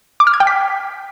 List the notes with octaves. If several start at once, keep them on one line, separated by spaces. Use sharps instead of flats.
D6
F6
G#6
G5
B6